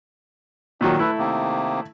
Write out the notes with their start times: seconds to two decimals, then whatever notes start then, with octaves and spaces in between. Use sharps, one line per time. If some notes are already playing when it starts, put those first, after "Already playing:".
0.81 A#2 D#3 F#3 D4
0.99 A3 E4 B4
1.18 C3 D#3 A#3